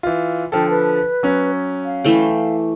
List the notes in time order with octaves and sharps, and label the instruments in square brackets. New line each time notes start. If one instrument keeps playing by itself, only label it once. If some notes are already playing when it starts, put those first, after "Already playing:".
[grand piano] E3 F4
[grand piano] D3 F3 A4 [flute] G5
[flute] B4
[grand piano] F#3 C#4
[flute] F5
[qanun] E3 A3 G5